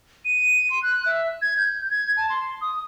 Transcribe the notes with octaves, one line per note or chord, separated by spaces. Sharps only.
D#7
C6
F#6
E5
G#6
G6
G#6
A5
C6
D#6